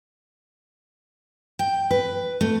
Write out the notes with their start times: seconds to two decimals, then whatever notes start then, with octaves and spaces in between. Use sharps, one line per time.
1.59 G5
1.91 B4
2.41 A3